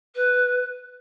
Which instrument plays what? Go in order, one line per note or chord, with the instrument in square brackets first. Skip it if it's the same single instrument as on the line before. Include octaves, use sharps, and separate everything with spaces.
[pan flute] B4